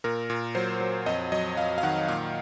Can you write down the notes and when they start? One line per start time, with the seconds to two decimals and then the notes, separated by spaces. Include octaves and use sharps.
0.04 A#2 A#4
0.30 A#2
0.55 F#3 C5
0.80 F#3
1.06 F2 D#5
1.32 F#3 D#5
1.57 F2 F5
1.78 F5
1.83 D#3 F#5
2.08 A#2 F5